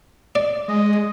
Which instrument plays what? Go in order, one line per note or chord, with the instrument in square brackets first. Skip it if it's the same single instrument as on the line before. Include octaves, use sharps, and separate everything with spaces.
[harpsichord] D5
[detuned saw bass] G#3 [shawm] D#5